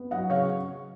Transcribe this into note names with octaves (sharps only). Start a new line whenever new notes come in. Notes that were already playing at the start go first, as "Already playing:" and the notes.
Already playing: B3
F#3 D#5 F#5
C#3 C#5 F5